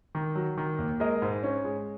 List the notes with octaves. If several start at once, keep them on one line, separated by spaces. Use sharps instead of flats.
D#3
F#3
D#3
D#2
G#3 A#4 D#5
G#2
C#4
G#3